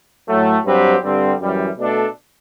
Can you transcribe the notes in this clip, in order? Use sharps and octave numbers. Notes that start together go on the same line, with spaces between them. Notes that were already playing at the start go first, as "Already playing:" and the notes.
A2 F#3 A3
G2 F#3 C4 G4 B4
G2 D3 G3 C4
F#2 E3 G3
B2 A3 D4 A4